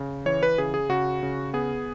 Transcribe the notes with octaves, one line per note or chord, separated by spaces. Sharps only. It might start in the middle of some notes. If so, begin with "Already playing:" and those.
Already playing: C#3
E3 C#5
B4
C#3 G#4
G#4
C#3 F#4
C#3
B3 G#4